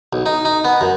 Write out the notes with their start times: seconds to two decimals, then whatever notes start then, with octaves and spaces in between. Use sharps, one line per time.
0.13 B1
0.26 D#4
0.45 D#4
0.64 B3
0.81 F#2